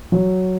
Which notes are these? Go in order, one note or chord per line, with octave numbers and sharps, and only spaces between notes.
F#3